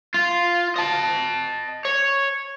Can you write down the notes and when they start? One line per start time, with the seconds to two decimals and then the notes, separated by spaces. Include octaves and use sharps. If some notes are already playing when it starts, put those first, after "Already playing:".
0.14 F4
0.76 D#5 A5
1.85 C#5